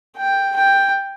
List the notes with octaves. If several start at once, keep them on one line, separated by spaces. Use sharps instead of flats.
G5
G5